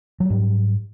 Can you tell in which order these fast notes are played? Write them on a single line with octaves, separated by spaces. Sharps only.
F#3 G3 G#2